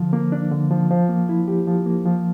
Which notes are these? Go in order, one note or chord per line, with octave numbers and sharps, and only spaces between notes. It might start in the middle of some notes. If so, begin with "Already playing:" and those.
Already playing: D3 F3
A#3
D4
D3
F3
F3
A#3
E4
G4
F3
A#3
F3